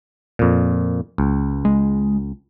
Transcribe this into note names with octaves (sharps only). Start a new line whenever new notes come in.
F2 A#2
C#2
G#3